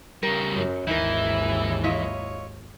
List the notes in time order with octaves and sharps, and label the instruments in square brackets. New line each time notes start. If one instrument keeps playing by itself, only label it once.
[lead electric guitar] C#3 G3 [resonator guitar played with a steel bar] A#4
[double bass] F#2
[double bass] G#1 D#2 [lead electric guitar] E3 [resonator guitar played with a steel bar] D#4 A#4 [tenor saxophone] E4
[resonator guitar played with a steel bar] E4 F4 D#5 [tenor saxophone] C#5